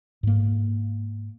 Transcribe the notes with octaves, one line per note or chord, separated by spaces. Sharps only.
G#2 A#3